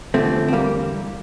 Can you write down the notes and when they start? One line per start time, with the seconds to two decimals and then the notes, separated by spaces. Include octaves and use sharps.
0.14 E2 D3 F3 A3 C4
0.48 C4
0.53 G3 A#3